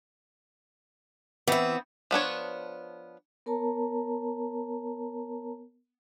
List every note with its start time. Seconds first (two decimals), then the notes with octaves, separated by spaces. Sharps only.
1.48 E3 B3 C4 E5
2.11 F3 B3 D4 C#5
3.46 B3 A#4 C#5 A5 A#5